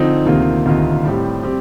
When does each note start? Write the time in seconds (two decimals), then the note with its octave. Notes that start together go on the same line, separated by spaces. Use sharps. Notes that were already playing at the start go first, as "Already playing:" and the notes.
Already playing: D3 F3 C4 D#4
0.26 D2 C3 D#3 A#3 F4
0.66 D2 C3 D#3 A#3 F4
1.04 A2 G3 C4 G4
1.43 G3 C4 G4